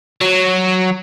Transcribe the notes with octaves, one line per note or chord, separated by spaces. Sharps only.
F#3